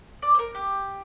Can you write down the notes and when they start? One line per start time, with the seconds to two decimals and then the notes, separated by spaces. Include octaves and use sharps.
0.22 D5
0.34 C5
0.39 A#4
0.55 G4